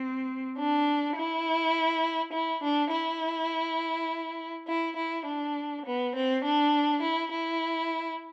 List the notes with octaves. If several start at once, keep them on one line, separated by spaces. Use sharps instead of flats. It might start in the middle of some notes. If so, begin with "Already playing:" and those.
Already playing: C4
D4
E4
E4
D4
E4
E4
E4
D4
B3
C4
D4
E4
E4